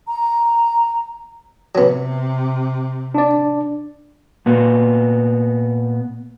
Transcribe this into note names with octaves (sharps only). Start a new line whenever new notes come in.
A#5
C3 F#3 B3
D4 D5
A#2 B3